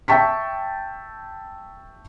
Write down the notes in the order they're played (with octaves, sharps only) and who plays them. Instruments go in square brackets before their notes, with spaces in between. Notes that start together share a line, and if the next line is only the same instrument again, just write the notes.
[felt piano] E5 G5 A5 C#6 B6